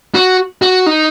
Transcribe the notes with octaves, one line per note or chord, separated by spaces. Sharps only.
F#4
F#4
D#4